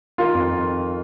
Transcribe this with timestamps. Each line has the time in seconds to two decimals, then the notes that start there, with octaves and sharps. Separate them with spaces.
0.18 D#3 F4
0.34 F2